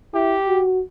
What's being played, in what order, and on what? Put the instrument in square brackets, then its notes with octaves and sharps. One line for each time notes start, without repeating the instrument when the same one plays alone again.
[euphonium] E4 [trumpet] G4
[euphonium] F#4